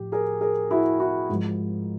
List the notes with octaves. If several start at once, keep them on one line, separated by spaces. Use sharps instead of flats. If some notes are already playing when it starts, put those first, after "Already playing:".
Already playing: A2 F3 G4
G#4 A#4
G#4 A#4
E4 F#4
E4 F#4
G#2 F3